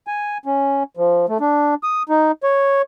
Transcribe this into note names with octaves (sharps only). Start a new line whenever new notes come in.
G#5
C#4
F3
A3
D4
D#6
D#4
C#5